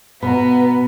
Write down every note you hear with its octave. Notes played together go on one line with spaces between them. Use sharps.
B2 B3 B4 A#5